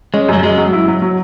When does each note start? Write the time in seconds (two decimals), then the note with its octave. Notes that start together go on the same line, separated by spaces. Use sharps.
0.14 G#3 C#4
0.29 F#2 F#3
0.43 F#2 G#3
0.58 F#3
0.73 E4
0.88 F#3
1.02 F#3